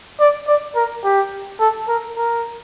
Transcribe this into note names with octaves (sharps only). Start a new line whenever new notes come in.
D5
D5
A#4
G4
A4
A#4
A#4